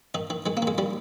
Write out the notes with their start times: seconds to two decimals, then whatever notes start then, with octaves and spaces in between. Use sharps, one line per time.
0.14 D#3 D#4
0.30 D#3
0.46 D#3 G#3
0.57 A#3
0.62 D#3
0.67 G#3
0.78 D#3 G3